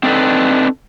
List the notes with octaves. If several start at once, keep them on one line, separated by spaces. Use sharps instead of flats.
C4 D4 D#4 F#4 A4 B4